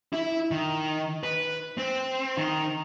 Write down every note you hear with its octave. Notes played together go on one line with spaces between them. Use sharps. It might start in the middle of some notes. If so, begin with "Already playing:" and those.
E4
D#3
B4
C4
D#3